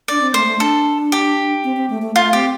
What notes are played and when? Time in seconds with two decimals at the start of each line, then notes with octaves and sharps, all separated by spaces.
0.08 D4 D5
0.21 C4
0.34 A3 C5
0.47 A3
0.59 D4 A4
1.12 G4
1.64 C4
1.77 C4
1.90 A3
2.02 A3
2.16 A3 F4
2.33 C4 G4